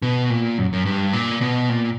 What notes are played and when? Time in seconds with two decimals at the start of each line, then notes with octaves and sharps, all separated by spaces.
0.02 B2
0.30 A#2
0.58 F#2
0.73 F#2
0.86 G2
1.13 A#2
1.41 B2
1.69 A#2